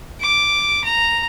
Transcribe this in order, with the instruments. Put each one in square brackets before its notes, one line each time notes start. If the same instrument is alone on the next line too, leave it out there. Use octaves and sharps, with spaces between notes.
[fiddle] D6
A#5